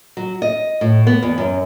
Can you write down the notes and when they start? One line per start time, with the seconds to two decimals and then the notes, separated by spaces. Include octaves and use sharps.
0.17 F#3
0.42 D#5
0.81 A2
1.07 B3
1.23 E2
1.38 F#2